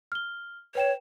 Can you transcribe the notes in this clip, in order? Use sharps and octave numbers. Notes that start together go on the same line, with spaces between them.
F6 G7
B4 C#5 G5 E7